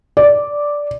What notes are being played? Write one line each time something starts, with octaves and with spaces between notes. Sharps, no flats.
D5